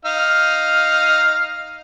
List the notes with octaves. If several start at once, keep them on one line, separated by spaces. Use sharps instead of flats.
D#4 F5 F6